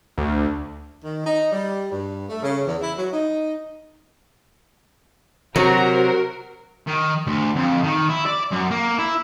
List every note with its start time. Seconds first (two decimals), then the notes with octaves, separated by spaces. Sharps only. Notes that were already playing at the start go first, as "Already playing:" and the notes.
0.18 D2
1.04 D#3
1.25 D#4
1.51 G3
1.92 G2
2.29 A3
2.42 C#3
2.66 E2
2.81 E4
2.97 F#3
3.13 D#4
5.56 C3 F#3 F#4 A#4 C5 A#5
6.87 D#3
7.27 D2
7.56 F2
7.83 D#3
8.09 E4
8.26 D5
8.51 F#2
8.71 A#3
8.99 E4